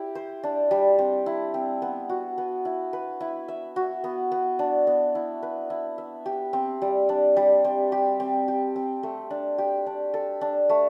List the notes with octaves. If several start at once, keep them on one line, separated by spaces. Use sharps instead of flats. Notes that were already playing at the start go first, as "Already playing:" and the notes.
Already playing: E4 G4 E5
C5
D4
G3
C4
E4
C4
B3
F#4
B3
E4
B4
E4
E5
F#4
B3
B3
D4
B3
E4
B4
E4
E5
G4
C4
G3
D4
G3
C4
G4
C4
G4
C4
A3
D4
G4
D4
A4
D4
A3